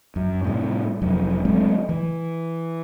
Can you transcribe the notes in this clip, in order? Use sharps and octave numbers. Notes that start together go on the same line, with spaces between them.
F#2
A2 C3 D#3 G3
F1 F#3
F#3 G#3 A3 C4
E3